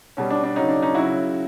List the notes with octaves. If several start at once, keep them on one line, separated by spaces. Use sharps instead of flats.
B2 G3 C#4
D4
D4
C#3 F#3 C#4 D#4
D4
C#4 D#4
C#3 F#3 E4 F#4